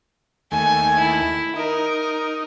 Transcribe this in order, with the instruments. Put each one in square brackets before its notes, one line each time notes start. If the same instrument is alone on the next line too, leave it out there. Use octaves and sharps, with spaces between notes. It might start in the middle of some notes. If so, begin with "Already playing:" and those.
[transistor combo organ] D#2 A3 [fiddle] G#5
[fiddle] E4
[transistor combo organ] D#4 [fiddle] A#4